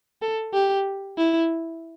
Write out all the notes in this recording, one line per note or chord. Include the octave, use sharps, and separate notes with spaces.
A4
G4
E4